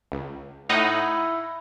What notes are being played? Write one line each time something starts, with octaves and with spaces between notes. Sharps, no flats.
C#2
A2 D#4 E4 F#5